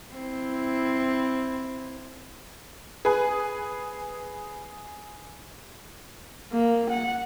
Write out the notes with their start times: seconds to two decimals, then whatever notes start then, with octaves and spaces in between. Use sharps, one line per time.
0.15 C4 E4
3.05 G#4 B4 G#5
6.52 A#3
6.90 F#5